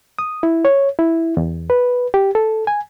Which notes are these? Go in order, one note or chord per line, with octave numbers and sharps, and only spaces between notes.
D#6
E4
C#5
E4
E2
B4
G4
A4
G#5